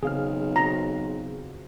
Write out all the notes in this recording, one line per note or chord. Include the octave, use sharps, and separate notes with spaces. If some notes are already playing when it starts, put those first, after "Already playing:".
B1 C#3 E3 C4 G#4 F5 F6
C4 F4 F#4 A#5